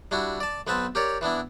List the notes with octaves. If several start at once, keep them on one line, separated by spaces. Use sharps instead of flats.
G3 D4 E4 F#4
D5 A5
B1 B3 C4 B4 A5
G4 A#4 C#5 D5
E3 B3 D4 E4